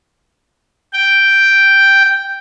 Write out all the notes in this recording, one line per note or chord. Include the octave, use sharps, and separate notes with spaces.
G5